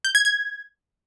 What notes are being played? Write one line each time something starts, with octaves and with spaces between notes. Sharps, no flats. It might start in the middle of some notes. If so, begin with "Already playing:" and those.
G6
G#6
G#6